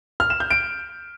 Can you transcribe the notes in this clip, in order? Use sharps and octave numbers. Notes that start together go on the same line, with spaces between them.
F6
E7
G6
D7